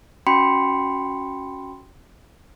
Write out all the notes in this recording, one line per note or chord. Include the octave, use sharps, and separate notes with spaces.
C#4 F#4 G5 B5 C6 C#7